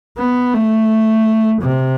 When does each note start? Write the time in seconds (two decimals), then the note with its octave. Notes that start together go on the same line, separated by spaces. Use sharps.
0.18 B3
0.53 A3
1.62 C3